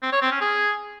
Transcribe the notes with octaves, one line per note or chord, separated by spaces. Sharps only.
C4
C#5
C4
C#4
G#4